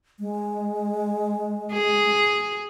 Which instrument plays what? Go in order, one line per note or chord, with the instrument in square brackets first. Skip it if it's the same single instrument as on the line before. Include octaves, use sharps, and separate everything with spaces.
[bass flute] G#3
[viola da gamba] G#4